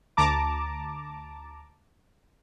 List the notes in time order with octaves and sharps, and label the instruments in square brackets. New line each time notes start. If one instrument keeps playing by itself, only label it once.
[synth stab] D2 A5 A#5 D6